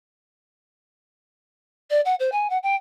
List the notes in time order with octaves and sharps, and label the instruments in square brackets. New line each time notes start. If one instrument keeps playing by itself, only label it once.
[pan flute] D5
F#5
C5
G#5
F#5
G5